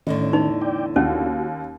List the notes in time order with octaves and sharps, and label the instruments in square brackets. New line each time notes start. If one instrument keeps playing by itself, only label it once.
[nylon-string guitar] E2 A2 D3 [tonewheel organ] D#3 C#4 [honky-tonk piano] D#5
[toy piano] D#4
[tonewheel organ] D5 G5
[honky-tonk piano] D#2 [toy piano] C#4 [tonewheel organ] F#4